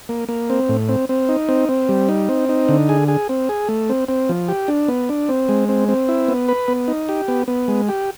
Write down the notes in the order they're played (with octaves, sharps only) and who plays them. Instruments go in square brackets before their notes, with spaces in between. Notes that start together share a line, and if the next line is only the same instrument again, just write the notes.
[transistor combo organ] A#3
A#3
C4
A2
C4
C4
D#4
C4
C4
G3
D#4
C4
D#4
D3
G#4
G#4
C4
G#4
A3
C4
C4
F3
G4
D4
B3
D4
C4
G#3
C4
C4
E4
B3
B4
B3
D#4
G4
B3
B3
G#3
G4